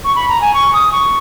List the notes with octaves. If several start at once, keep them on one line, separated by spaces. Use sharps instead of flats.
C#6
B5
A#5
G#5
C#6
D#6
C#6